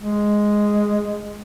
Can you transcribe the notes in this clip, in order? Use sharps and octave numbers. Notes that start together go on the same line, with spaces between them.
G#3